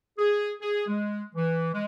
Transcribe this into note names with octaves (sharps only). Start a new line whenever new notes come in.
G#4
G#4
G#3
E3
G#3